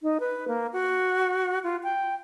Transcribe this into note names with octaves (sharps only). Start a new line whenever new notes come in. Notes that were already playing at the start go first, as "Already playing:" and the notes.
D#4
B4
A#3
F#4
F4
G5